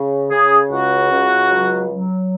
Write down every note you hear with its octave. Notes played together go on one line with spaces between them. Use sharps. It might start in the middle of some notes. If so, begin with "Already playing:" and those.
Already playing: C#3
C#3 G#4
C#2 F#4
C#2
F#3
F#3